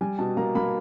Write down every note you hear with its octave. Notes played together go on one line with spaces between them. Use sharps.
G3 G#5
B2 A5
A#3 A#5
A#3 B5